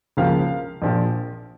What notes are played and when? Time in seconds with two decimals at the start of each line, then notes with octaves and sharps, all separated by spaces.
0.17 C#2 C#3 F3 A#3 F5
0.82 A#1 A#2 F3